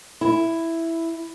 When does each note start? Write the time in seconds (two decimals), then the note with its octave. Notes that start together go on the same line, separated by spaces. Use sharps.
0.21 E4